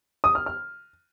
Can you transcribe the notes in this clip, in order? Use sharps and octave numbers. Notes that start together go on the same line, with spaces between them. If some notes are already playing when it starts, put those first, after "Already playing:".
D#6
F6
F6